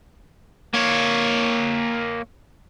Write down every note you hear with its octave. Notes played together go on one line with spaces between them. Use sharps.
A#3 C#5